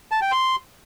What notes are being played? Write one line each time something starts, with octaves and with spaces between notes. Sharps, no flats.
A5
G5
C6